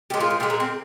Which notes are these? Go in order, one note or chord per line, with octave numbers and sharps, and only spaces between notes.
A#2 G#3 G4
F4
C4
A#2 G#3 G4
A#3
C4